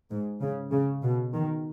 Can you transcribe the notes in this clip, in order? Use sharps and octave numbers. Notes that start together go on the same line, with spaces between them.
G#2
C#3
C#3
B2
D#3